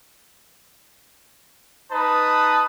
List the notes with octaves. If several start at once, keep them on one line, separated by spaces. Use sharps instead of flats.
D#4 B4 A5 D#6